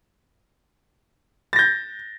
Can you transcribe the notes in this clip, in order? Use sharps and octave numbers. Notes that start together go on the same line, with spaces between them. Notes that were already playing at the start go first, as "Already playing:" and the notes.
G6 A6 A#6